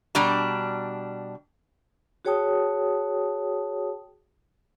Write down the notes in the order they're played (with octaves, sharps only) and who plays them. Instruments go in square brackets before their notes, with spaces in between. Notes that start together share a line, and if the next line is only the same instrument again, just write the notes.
[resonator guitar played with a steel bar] B2 G3 D4 D5 A#5
[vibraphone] F#4 G#4 C#5 G5 A5 D#6